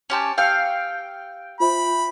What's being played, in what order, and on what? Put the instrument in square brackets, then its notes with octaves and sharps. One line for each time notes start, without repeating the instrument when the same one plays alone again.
[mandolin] C#4 G4 A5 [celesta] G#5 C6 G6
[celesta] G4 E6 C#7 [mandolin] F5 [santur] G5
[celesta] F4 C5 E5 [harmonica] B5